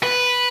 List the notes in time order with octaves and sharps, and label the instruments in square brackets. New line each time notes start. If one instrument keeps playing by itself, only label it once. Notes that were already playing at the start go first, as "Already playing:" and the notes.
[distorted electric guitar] B4